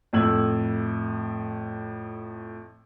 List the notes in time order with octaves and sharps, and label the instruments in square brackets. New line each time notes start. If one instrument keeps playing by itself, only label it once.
[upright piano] F2 A2 E6 G#6 F#7